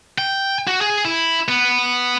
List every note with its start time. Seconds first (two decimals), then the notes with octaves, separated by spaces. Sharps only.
0.18 G5
0.67 F#4
0.81 G#4
1.05 E4
1.48 B3